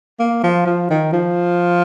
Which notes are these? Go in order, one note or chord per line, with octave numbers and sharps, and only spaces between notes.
A#3
F3
F3
D#3
F3